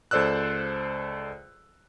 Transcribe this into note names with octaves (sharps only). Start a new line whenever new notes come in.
C#2 A4 C5 D5 E6 F#6